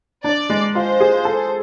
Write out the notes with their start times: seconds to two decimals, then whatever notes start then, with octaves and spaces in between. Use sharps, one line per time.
0.24 D4 D5
0.49 G#3
0.75 F4 C5
1.00 G#4
1.25 A4